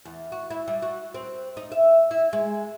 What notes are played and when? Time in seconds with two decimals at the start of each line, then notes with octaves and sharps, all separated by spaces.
0.05 E2
0.32 F#4
0.50 E4
0.68 G3
0.82 F#4
1.15 C4
1.57 D#4
1.72 E5
2.11 E4
2.33 G#3